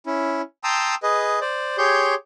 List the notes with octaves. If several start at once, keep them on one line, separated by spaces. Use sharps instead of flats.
C#4 E4
G5 A5 A#5 C6 D#6 E6
G#4 B4 D#5
C5 D5
G4 G#4 C#5 C6 G6